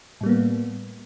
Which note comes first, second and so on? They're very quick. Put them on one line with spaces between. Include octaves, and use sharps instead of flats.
A2 G3 A#3 B3